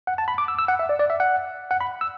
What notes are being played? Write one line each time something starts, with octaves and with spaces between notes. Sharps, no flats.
F#5
A5
B5
D6
E6
E6
F#5
E5
D5
D5
E5
F#5
F#5
B5
E6